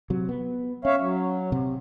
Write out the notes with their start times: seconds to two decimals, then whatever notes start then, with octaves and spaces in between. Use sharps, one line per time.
0.10 C3 F#3
0.29 B3
0.85 C#4 C#5 E5 F5
1.00 F#3
1.52 C3